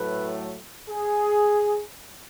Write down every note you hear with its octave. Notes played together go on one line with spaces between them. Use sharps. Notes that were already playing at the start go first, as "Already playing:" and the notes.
Already playing: A2 F#3 A3 B4
G#4